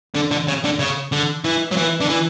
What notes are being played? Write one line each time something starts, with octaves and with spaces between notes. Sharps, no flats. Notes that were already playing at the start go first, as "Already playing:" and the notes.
D3
D3
C#3
D3
C#3
D3
E3
F#3
E3
D3
E3